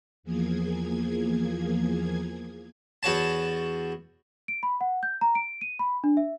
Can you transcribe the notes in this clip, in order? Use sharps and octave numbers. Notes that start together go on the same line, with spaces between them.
E2 F3 A#3 G#4 G#6
E2 F#4 C#5 A5
D7
B5
F#5
G6
A#5
D7
D#7
B5
D4
E5